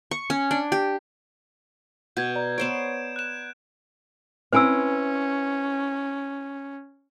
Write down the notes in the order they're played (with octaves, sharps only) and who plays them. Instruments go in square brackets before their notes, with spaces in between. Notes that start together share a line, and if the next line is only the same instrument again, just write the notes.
[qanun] C#6
C#4
D4
G4
[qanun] B2 [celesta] F#5 [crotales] G6 G#6
[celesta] D5 A#5
[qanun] B3 C5 C#5 [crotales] D7 E7
[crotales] F#6 E7
[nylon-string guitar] C4 E4 B4 [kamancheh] C#4 [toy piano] C5 G#5 E6